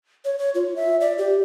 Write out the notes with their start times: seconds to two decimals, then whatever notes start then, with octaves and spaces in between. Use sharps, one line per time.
0.25 C#5
0.39 C#5
0.55 F4
0.76 E5
1.01 D5
1.18 G4